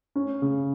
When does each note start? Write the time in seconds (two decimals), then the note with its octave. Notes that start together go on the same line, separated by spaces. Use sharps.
0.16 C#4
0.42 C#3